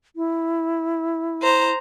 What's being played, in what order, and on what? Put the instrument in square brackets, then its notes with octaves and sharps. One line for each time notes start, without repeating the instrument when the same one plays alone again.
[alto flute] E4
[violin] C5 A#5